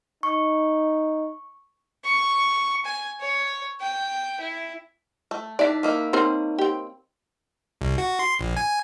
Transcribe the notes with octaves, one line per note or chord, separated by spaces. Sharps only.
D#4 C#6
C#6
G#5
C#5
G5
E4
A3
E3 D4 D#4 D5 E5 B6
D#3 A#3 E4
C4 D#4 A#4 C5 C#5
C4 G4
C2
F#4
C6
A#1
G#5